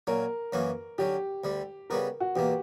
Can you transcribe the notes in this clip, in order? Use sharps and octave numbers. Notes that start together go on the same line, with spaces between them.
A#2 F#3 C#4 A#4
F#2 E3 A#3 C#4 F#4
D3 F#3 C#4 G4
D2 D3 G3
C#3 G3 B3 F#4 A#4
F#4
E2 B2 A#3 G4